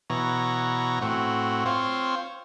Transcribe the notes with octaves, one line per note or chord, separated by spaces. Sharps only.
B2 E3 C#5 A#5
A2 C4 F#4
C4 F4 C5 C#5